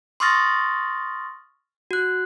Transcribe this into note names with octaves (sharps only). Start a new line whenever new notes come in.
C6 C#6 D#6 F6 A6 A#6
F#4 F#6